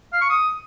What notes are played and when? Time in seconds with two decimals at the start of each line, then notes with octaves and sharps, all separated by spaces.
0.13 F5
0.21 C#6
0.30 D#6